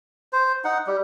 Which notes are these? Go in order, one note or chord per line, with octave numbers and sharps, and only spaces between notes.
C5
D#4 F#5
G3